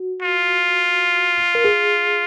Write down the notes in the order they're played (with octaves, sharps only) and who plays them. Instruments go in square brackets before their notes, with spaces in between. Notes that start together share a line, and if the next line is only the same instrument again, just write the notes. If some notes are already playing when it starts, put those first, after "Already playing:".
Already playing: [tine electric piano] F#4
[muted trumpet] F4
[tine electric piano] A#4
G#4